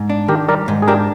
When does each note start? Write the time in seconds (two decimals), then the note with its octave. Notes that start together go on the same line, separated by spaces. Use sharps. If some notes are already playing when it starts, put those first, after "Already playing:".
Already playing: G#2
0.10 D4
0.28 D#3 G4 A#4
0.48 G3 A#4 D5
0.68 G#2
0.82 G#4
0.88 D4 G4 A#4